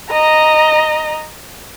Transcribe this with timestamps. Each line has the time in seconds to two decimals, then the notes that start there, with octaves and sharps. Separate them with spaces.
0.12 D#5 A#5